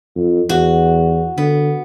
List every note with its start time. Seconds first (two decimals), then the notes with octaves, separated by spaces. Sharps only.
0.16 F2
0.49 E2 F#4
1.38 D3 B3